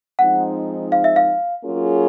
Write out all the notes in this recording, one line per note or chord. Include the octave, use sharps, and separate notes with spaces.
F3 G#3 C4 D#4 F#5
F5
E5
F5
F#3 A#3 C#4 F4 G#4